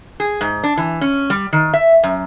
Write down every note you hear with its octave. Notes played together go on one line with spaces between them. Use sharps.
G#4
G#2
D4
E3
C#4
G3
D#3
E5
F#2